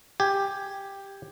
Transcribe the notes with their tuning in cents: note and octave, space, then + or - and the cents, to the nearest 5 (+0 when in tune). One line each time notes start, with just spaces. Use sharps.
G4 +10 G#5 +0